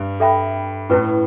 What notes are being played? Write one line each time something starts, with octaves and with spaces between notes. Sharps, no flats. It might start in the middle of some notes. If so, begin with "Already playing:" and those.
Already playing: G2
A4 E5 G5 B5
A2 C#4 E4 B4